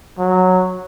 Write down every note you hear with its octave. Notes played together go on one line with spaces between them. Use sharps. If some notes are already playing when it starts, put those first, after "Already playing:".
F#3